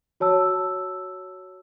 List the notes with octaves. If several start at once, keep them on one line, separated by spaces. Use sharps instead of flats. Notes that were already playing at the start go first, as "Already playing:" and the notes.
F#4 C#5 A5 E6